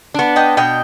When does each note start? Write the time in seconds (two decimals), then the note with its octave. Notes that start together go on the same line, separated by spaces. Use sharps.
0.14 B3 D4
0.36 D#5 G5
0.57 B2 D#5 G5